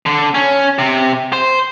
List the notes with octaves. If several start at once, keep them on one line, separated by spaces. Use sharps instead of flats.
D3
C#4
C3
C5